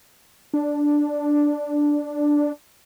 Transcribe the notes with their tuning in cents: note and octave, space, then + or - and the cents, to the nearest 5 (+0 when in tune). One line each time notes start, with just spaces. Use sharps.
D4 +0